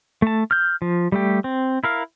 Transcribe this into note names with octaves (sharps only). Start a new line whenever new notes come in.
A3 A5
F6 G6
F3
G3 A3 G4
C4
E4 A#4 F5